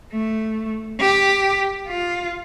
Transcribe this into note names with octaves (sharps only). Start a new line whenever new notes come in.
A3
G4
F4